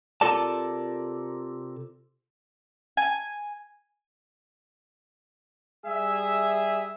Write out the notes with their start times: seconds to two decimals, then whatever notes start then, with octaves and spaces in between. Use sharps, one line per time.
0.21 C3 F4 A4 A#4 D5 A5
2.97 G#5
5.85 G3 G#4 E5